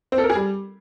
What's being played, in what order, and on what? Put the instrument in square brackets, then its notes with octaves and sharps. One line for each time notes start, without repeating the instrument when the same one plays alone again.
[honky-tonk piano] C4
A4
A#4
G#4
G3